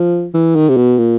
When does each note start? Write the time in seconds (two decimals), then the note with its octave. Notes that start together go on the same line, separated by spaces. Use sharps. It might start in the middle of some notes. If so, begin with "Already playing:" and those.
Already playing: F3
0.34 E3
0.55 D#3
0.69 C3
0.77 B2
0.98 A#2